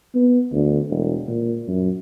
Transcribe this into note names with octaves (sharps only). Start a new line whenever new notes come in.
B3
D2
E1
A#2
F#2